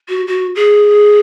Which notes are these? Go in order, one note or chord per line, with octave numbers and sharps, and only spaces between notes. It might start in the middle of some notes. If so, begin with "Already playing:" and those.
F#4
F#4
G#4